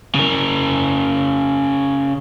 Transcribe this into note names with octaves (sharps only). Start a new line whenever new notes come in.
C#3 A#4